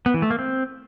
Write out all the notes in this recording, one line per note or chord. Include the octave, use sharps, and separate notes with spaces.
B3
E3
A3
A#3
C4